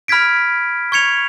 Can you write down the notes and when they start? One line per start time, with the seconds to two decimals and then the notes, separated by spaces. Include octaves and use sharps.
0.08 B5 F6 G#6 B6 D7
0.92 C#6 G#6 C#7 F7